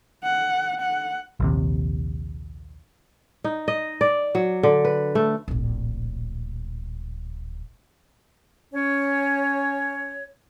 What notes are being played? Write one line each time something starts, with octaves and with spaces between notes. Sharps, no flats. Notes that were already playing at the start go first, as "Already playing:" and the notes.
F#5
F#5
A#1 D#2 C3
D#4
D#5
D5
F#3
D3
B4
A3
D1 A#1
C#4 C#5